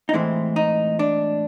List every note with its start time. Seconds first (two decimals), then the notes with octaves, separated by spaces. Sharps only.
0.09 D#4
0.13 A2 E3 G#3 C4 E4
0.56 D#4
0.99 D4